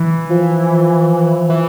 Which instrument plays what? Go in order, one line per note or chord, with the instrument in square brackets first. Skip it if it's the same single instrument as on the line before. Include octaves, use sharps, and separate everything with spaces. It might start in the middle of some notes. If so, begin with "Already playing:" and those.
Already playing: [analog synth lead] E3
[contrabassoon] F3
[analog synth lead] E3